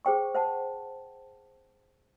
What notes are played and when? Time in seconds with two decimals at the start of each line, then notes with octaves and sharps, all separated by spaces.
0.05 G#4 C5 G5 C#6
0.34 C5 F#5 A5